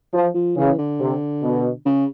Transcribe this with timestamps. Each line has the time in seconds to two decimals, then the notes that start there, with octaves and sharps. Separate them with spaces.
0.13 F3
0.34 F3
0.56 C#3 E3
0.78 D3
0.99 C3
1.42 B2
1.86 C#3